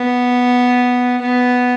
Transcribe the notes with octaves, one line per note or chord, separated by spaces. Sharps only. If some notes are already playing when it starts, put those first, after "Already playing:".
Already playing: B3
B3